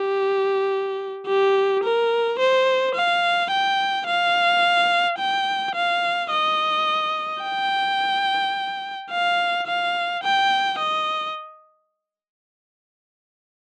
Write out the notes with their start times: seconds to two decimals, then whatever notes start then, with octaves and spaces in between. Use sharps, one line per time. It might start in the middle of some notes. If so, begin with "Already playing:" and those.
Already playing: G4
1.27 G4
1.84 A#4
2.39 C5
2.95 F5
3.51 G5
4.07 F5
5.19 G5
5.75 F5
6.30 D#5
7.43 G5
9.11 F5
9.67 F5
10.23 G5
10.79 D#5